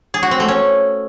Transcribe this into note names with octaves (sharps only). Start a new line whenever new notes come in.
G#4
F#4
C4
A3
C#4